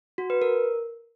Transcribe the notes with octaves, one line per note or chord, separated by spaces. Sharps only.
F#4
B4
A#4